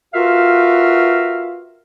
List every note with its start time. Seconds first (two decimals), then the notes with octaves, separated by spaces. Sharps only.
0.14 F4 F#4 A#4 B4 E5 F5